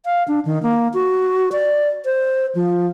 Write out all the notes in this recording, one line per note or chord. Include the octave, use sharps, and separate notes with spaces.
F5
D4
D#3
A#3
F#4
D5
C5
F3